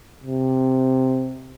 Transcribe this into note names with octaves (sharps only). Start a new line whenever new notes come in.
C3